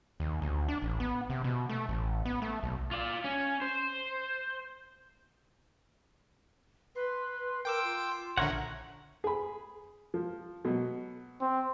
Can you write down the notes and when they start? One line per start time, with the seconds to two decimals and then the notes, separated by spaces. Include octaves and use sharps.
0.20 D#2
0.42 D2
0.68 D4
0.82 A1
1.00 B3
1.30 C3
1.44 B2
1.69 A3
1.89 A1
2.26 B3
2.42 A3
2.63 B1
2.91 F4 D5
3.24 C#4
3.62 C5
6.96 B4 C6
7.65 A#4 G5 D6 E6
7.84 F4
8.37 A#1 D3 A#4 C#5 E5 F#5
9.24 G#4 B5
10.14 F3
10.65 B2 F#3
11.41 C4